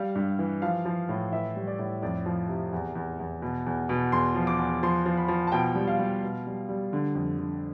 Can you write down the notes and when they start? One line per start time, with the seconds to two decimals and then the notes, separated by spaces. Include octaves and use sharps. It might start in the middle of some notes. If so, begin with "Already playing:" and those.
Already playing: G3 F5
0.15 G2
0.39 E3
0.62 F3 F5
0.85 F3
1.09 A2
1.32 E3 E5
1.56 G3
1.67 D5
1.79 A2
2.02 F2 D5
2.26 F3
2.48 C3
2.73 E2
2.95 E2
3.20 E2
3.42 B2
3.66 E2
3.89 B2
4.12 E2 C6
4.35 F3
4.47 D6
4.59 E2
4.83 F3 C6
5.06 F3
5.17 B5
5.28 F3
5.47 A5
5.52 B2 G5
5.75 G3
5.87 F5
5.99 G3
6.23 B2
6.46 G3
6.69 G3
6.93 D3
7.15 F2
7.39 D3